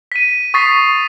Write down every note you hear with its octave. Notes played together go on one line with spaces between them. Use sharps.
B6 D#7
C#6 D#6 A6 B6 C7